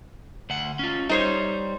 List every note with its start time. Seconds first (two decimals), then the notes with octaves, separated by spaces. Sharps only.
0.50 D2 F#5
0.79 C#4 F4
1.09 G3 D#4 C5 C#5